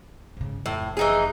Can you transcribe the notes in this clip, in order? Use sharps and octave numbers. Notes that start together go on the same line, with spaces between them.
G#2 C#3
F1 A2
E3 D#4 G#4